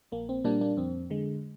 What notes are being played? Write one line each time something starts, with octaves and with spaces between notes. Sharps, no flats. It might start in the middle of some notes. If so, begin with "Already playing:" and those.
A#1 A#3
C4
A#2 G3 A#3 D4
A#3 D4
F2 C4
D3 G#3